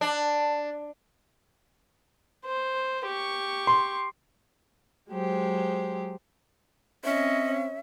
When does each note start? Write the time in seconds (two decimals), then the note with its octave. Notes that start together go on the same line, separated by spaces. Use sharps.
0.01 D4
2.45 C5
3.06 G4 C#6
3.67 C6
5.10 F#3 G#3 G4 C5
7.04 C4 C#4 D#5 E5